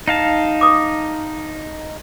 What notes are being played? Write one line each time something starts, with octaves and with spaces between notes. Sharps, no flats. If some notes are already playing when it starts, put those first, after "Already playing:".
D#4 F5 A5
D6 D#6